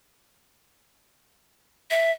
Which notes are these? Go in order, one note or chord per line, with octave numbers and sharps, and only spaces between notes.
E5